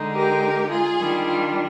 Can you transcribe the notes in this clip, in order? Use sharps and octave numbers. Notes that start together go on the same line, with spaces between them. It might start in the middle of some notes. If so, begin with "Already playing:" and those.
Already playing: D3 G#3 D#4
G4 A#4
F4 G#4
D#3 G3 D4
F4